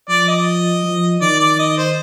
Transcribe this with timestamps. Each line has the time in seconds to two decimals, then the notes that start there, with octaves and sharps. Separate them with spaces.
0.09 F3 D5
0.28 D#5
0.84 F3
1.21 D#3 D5
1.40 D5
1.59 D#5
1.78 C5